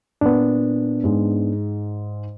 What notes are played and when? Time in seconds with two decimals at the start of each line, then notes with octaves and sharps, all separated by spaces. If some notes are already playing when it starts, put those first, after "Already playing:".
0.21 A#2 B3 D4
1.04 G#2 G#3